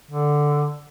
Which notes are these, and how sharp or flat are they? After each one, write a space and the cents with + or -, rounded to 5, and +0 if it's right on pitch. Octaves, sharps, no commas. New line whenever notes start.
D3 +0